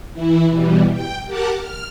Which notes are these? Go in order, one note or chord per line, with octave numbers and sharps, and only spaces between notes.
E3 E4
B2 E3 G3
G5
G4 A#4 F#5 A5 D6
F6